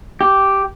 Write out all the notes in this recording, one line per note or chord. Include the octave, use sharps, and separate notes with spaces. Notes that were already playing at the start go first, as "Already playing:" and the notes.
G4